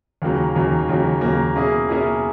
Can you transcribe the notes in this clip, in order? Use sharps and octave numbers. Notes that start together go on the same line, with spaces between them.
D#2 C#3 F#3 A#3
D#2 C#3 F#3 A#3
D#2 C#3 F#3 A#3
D#2 C#3 F#3 A#3
B2 A#3 C#4 E4 G#4
B2 A#3 C#4 E4 G#4